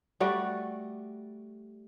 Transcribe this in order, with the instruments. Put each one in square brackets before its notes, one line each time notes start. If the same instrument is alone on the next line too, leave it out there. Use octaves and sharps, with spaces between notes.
[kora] G3 A3 F#4 D5